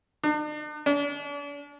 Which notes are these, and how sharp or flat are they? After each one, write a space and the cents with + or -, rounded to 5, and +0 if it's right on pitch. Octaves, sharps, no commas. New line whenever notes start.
D4 +45
D4 -40